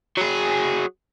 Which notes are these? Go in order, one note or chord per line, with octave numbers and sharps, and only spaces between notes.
F#3 G#4